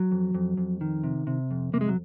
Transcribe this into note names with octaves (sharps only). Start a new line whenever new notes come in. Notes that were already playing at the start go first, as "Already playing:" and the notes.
Already playing: F#3
F2
F2
F2
D#3
C3
C3
F2
C3 A#3
G#3
F#3